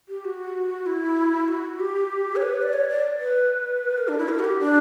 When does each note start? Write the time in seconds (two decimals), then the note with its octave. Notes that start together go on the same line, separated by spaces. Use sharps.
0.09 G4
0.25 F#4
0.86 E4
1.48 F#4
1.79 G4
2.36 C#5
2.42 B4
2.62 D5
2.73 C#5
2.89 D5
3.20 B4
3.98 A#4
4.08 D4
4.18 E4
4.29 A#4
4.39 F#4
4.44 G4
4.60 D4